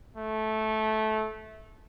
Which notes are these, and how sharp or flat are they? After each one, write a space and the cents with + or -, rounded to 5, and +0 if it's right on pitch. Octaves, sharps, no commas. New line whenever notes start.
A3 -15